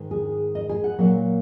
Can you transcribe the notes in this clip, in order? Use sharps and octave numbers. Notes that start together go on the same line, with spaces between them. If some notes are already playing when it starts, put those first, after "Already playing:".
Already playing: G#2 D#3 G#3
G#4
D#5
G#4
F#5
A#2 F#3 A#3 F#5